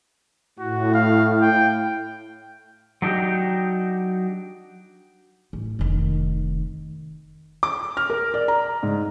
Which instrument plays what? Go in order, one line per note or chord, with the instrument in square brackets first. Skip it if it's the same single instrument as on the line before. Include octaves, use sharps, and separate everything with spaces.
[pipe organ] A2 [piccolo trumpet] F#4
[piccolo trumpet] F5
G5
[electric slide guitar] F#3 D4 D#4 F#4 G4
[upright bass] A1
F1 D#3
[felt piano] D6
F6
A#4
D5
A#5
G#2